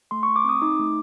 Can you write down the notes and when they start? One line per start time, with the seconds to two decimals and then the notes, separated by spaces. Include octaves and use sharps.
0.11 A3 C6
0.23 C#6
0.28 A3
0.36 D6
0.44 C4 D#6
0.62 D#4 D6
0.79 A3